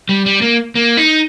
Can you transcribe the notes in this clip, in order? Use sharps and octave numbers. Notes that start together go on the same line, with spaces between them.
G3
G3
A#3
A#3
D#4